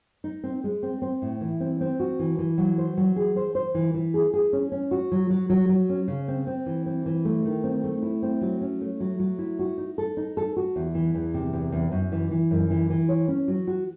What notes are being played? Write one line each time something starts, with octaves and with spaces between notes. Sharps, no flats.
D#4
C4
G#3
C4
C4
A2
E3
C4
C4
F#4
E3
E3
F#3
C5
F#3
G#4
C5
C5
E3
E3
G#4
G#4
C#4
C#4
F#4
F#3
F#3
F#3
F#3
C#4
C#3
C4
C4
E3
C4
E3
A3
D#3
C4
A3
E4
C4
F#3
C#4
A3
F#3
F#3
E4
F#4
D#4
A4
D#4
A4
F#4
E2
E3
E2
C3
E2
E2
F#2
E3
E3
F#2
E3
E3
C#5
C#4
F#3
F#4